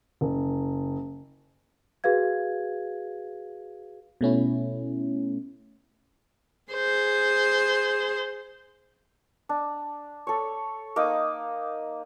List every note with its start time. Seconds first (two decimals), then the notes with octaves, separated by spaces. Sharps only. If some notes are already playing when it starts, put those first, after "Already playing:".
0.21 F#1
2.04 F#4 G#4 B4 F5 G#6
4.21 B2 A3 C#4 E4
6.72 G#4 C5
9.49 D4
10.27 A4 C#5
10.96 A#3 D#4 D6 D#6